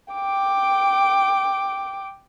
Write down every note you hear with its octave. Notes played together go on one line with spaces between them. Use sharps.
G5 D6